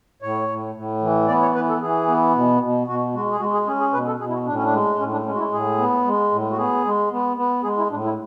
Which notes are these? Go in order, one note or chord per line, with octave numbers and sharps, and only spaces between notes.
A2 C#5
A2
A2
E3
B3 D5
C#5
E3 B4
A4
E3 G#4
B3
B2
B2
B2 F#4
G#3 F#4
G#4
G#3 F#4
G#4
C#4 G#4
G#4
B2 B4
A4
B2 G#4
E4
F#4
A2 D4
C#4
D4
G#3
A2 C#4
D4
G#3 C#4
F#4
E4
A2 G#4
B3
G#3
A2
F#4
B3 G#4
G#3
B3
B3
G#3 G#4
E4
A2 D4
E4